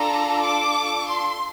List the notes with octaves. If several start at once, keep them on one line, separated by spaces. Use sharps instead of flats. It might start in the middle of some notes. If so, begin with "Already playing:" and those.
Already playing: D4 F4 A4 A#5
D6
C6